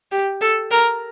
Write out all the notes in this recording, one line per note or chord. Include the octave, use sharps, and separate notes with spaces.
G4
A4
A#4